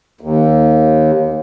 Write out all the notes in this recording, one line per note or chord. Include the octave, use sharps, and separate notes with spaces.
D#2